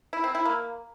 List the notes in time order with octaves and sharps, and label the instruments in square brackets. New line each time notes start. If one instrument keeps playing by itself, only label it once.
[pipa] E4
C4
E4
A#3